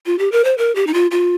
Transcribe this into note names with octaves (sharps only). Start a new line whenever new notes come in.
F4
G4
A#4
C5
A#4
G4
D#4
F4
F4